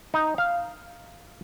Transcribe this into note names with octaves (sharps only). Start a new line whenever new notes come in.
D#4
F5